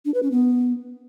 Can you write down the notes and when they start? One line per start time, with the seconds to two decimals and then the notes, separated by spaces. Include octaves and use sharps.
0.05 D4
0.14 B4
0.23 C#4
0.32 B3